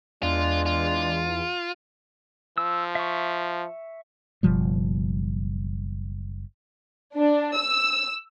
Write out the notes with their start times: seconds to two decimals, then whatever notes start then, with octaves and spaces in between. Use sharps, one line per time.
0.23 E2 G#3 D4 F4
0.66 F4
2.58 F3 E6
2.95 E5 C#6
4.43 F#1 B2 F3 G3
7.16 D4
7.57 E6